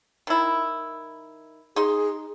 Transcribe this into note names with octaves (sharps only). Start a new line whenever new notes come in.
D#3 E4
D#4 G#4 C6